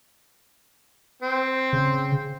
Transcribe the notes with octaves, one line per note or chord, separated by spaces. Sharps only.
C4
C#3